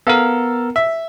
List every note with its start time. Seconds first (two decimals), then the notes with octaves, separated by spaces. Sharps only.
0.07 B3 A4 A#4 F5
0.76 E5